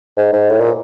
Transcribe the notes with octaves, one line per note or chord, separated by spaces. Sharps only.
G#2
G#2
A2
A#2